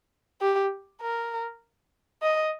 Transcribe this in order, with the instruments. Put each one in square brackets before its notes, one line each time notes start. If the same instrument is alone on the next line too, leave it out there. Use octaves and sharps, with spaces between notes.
[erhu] G4
A#4
D#5